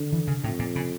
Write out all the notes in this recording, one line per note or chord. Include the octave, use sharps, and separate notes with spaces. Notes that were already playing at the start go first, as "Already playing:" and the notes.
Already playing: D3
E3
C#3
F2 A2
A#2
C#3